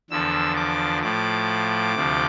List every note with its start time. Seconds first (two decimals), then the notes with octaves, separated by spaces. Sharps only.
0.10 E2 D3 F3 E6
0.57 D6
1.03 A2 F3 D6
1.95 D2 C3 F3